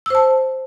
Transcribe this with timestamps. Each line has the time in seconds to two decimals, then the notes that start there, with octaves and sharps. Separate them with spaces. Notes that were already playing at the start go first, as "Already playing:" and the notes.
0.06 E6
0.10 C5
0.15 A5